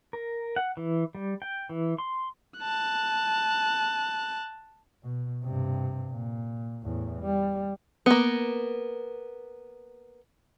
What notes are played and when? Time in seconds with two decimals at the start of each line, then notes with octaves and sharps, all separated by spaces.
0.13 A#4
0.56 F#5
0.77 E3
1.15 G3
1.42 G5
1.69 E3
1.98 C6
2.60 A5 F#6
5.03 B2
5.45 G2 C3
6.11 A#2
6.84 E2 A2
7.21 G3
8.06 A#3 B3